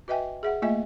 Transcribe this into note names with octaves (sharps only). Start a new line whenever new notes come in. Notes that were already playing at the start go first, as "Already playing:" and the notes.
F#4 B4 D#5 E5 G5 G#5
G#4 E5 F#5
A3 A#3 F4 D#5 E5 G#5